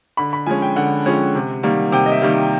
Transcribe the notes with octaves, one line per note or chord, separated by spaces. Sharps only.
D3 B5
B5
F3 G#3 C#4 G#5
G5
D3 F#5
F3 G#3 C#4
C3
D#3 G3 A#3
C3 G5
D#5
E5
D#3 G3 A#3